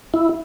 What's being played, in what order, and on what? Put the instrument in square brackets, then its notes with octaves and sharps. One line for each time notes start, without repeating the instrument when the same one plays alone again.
[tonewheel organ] E4